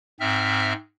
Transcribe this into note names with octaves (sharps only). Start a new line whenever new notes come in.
G#2 C4 E5 F6